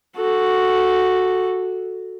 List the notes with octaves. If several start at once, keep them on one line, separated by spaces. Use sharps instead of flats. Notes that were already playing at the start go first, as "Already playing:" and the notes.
F#4 A4